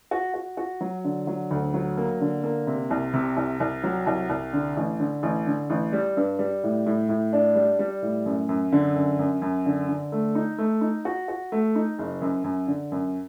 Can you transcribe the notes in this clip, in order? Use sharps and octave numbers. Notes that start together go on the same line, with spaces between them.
F#4
F#4
F#4
F#3
D3
F#3
D2
F#3
A#3
D3
A#3
C3
C2
C3
C2
C2
F#3
C2
C2
D3
A1
D3
A1
D3
A1
G3
G2
G3
A2
A2
A2
D4
G3
G3
A2
F#2
F#2
D3
F#2
F#2
F#2
D3
D3
A3
D#4
A3
D#4
F#4
F#4
A3
D#4
F#1
F#2
F#2
D3
F#2